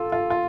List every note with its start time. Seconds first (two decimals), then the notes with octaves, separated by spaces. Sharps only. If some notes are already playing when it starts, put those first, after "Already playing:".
Already playing: F4 A4
0.12 F4
0.30 F4